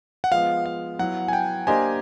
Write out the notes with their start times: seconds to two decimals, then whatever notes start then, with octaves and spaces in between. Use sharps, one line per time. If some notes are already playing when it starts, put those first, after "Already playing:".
0.24 F#5
0.31 F3 G#3 B3 F5
0.66 F5
0.99 F#3 B3 E4 F#5
1.28 G#5
1.33 G5
1.67 A#3 D4 G4 C5 D#5 G#5